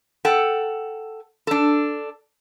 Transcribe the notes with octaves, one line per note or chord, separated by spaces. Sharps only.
A4 F#5 G5
D4 A4